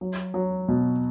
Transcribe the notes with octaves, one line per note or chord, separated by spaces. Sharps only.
F#3
F#3
B2